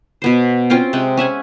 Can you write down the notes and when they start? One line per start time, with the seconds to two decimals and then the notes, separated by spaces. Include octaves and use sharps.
0.22 B2 B3 C5
0.70 C4 C#4 F4 G5
0.93 C3 G#3 F#5 G5
1.17 C#4 E5 F#5 G#5